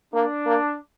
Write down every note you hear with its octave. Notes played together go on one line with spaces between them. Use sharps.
A#3 D4
A#3